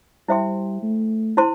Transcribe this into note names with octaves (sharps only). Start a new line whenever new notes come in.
G3 E4 C5 E5 G5 C6
A3
E4 C5 A5 C6